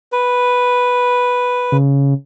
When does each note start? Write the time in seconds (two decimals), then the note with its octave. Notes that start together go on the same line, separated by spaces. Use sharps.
0.12 B4
1.72 C#3